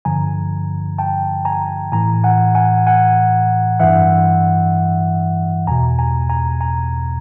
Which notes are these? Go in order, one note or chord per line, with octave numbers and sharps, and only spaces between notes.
G2 D3 F3 G#5 A#5
G5 A5
G#5 A#5
A2 E3 G#5 A#5
F#5 G#5
F#5 G#5
F#5 G#5
G2 E3 E5 F#5
E2 B2 G#5 A#5
G#5 A#5
G#5 A#5
G#5 A#5